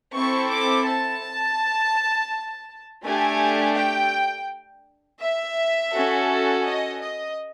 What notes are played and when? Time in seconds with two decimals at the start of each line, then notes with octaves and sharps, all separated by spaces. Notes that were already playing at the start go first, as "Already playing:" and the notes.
0.15 C4 E4 A4 C#6
0.51 D6
0.87 A5
3.03 A3 D4 G4 G#5
3.76 G5
5.20 E5
5.92 C#4 F#4 A4
6.65 D#5
7.01 D#5